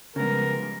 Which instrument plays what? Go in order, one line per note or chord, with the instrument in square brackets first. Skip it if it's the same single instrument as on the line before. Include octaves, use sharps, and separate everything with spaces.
[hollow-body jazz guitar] C#3 B3 [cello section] F3 G3 G#3 [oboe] A#4